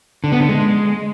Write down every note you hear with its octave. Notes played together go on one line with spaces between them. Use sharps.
D3
B3
D3
G#3